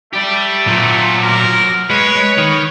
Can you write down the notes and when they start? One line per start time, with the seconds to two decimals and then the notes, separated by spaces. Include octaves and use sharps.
0.13 A3 G4 D5
0.68 A#2 F#3 C5
1.23 A#4
1.90 G#3 B4 C#5
2.38 D#3